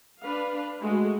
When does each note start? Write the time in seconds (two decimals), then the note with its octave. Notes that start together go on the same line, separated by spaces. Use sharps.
0.22 D4 B4 F5
0.81 G#3 A3 F#4